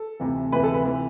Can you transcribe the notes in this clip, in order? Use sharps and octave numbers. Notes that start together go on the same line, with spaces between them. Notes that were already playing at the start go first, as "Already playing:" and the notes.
Already playing: A4
D2 C3 E3
D2 C3 E3 B4
A4
B4
C3 E3